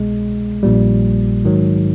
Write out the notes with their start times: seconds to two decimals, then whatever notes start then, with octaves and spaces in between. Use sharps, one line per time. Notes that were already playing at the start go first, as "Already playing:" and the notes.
Already playing: C2 B2 G#3
0.63 A#1 A#2 G3
1.45 G#2 D#3 F#3